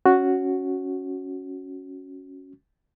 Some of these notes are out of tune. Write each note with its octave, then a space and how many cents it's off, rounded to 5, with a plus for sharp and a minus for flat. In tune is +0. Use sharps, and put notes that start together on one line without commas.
C#4 +0 F#4 +0